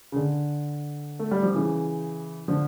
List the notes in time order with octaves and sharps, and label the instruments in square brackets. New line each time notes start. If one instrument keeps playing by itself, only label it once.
[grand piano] C#3
D3
A3
G3
F3
C#3 E3
D3 F3